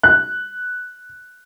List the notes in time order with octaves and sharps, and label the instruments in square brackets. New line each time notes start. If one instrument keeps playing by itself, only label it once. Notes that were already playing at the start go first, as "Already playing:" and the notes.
[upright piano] F#6